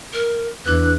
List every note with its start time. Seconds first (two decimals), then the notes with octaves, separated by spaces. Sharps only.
0.13 A#4
0.66 E2 D4 E4 B4 F#6